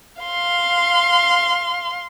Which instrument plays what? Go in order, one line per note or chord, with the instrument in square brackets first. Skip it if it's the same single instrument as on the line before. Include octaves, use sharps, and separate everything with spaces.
[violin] F5 C6